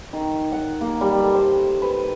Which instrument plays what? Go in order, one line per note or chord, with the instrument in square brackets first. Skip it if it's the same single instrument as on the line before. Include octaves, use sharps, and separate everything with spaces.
[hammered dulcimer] D#3
F#5
A#3
G3
A4
C5
B4